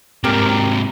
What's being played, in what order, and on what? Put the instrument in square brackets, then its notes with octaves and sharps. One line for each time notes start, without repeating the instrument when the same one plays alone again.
[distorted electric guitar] G#2 C3 [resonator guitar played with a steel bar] G4 A#4